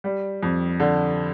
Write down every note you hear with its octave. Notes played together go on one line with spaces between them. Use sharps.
G3
F2
D3